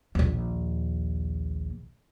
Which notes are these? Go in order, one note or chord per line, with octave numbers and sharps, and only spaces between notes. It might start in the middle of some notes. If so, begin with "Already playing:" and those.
A#1 D#2